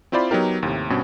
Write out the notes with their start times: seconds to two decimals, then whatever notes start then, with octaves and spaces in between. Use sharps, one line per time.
0.12 C4 E4 F4 C5 D5 B5
0.31 F#3 B3 D#4 G4 A#4
0.63 D#2 A2 C3
0.90 G2 B2 C4 C#4